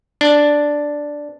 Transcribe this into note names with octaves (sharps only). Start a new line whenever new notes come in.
D4